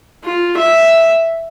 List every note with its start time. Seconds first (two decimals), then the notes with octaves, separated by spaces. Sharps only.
0.24 F4
0.57 E5